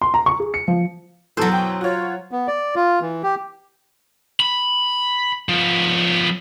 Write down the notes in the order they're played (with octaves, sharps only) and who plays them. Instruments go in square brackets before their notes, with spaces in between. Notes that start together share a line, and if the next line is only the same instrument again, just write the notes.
[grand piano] C6
A#5
C#6
G#4
C#7
F3
[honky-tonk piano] F#2 B2 E3 [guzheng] F#3 C5 [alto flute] A4
[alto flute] G5
[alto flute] F4 [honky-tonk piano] F#4 C#5
[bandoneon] B3
D5
F4
E3
G4
[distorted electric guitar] B5
F3 B3